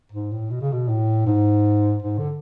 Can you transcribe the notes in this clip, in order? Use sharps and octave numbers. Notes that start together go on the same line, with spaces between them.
G#2
A2
B2
C#3
B2
A2
G#2
G#2
D3